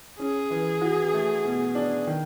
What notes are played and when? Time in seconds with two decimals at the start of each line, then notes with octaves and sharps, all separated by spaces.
0.19 C#4 G#4
0.50 E3
0.81 F#4
1.14 A3
1.45 B2
1.75 D4
2.07 D#3